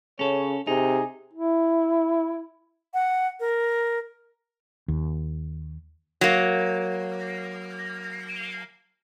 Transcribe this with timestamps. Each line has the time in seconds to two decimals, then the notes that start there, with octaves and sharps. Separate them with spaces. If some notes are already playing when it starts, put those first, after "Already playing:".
0.19 C#3 C#4 A4 C#5
0.67 C3 D#4 G#4
1.33 E4
2.94 F#5
3.40 A#4
4.88 D#2
6.21 F#3 A#3